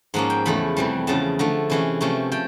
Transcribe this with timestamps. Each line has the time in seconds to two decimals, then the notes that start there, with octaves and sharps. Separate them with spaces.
0.14 G#2 F3 A#3 C#4 F#5
0.30 G5
0.45 E2 C#3 F3 A3 B5
0.77 F2 C3 E3 G3
1.07 E2 C#3 F3 A5
1.39 D3 F3 A3
1.70 C3 E3 G#3 C#4
2.01 C3 F3 A3 C#4
2.32 F3 G5